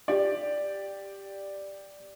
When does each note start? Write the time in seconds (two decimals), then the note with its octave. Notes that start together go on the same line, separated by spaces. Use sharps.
0.08 G4 D5